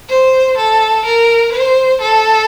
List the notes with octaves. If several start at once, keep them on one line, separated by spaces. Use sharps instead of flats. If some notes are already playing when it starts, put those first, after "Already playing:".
C5
A4
A#4
C5
A4